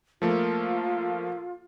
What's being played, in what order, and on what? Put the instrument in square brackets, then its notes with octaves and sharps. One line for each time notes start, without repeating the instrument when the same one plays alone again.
[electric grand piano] F3 A3 A#3 [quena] F4